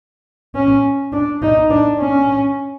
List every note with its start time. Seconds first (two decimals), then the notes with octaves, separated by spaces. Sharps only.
0.55 C#4
1.12 D4
1.42 D#4
1.70 D4
1.99 C#4